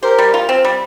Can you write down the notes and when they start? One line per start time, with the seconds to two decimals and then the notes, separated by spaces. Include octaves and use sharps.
0.02 G4 A#4 C5
0.19 G3
0.34 F4
0.49 C4
0.65 G3